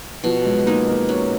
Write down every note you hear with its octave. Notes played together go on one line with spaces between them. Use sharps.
B2 F3
F#3
G#3
G#3 A#3 D#4
A#3
F#3 C#4